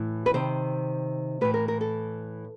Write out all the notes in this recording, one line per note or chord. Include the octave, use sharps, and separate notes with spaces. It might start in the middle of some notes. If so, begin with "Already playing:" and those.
Already playing: A2 E3
B4
C3 D#3 C5
A2 E3 B4
A#4
A#4
A4